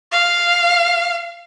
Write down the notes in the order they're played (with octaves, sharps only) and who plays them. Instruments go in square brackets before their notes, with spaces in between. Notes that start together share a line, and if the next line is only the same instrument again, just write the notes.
[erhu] F5